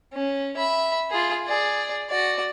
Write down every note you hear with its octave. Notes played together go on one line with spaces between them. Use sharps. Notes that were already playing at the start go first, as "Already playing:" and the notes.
C#4
E5 B5
F4 G#4
G#4 D5
F#4 D5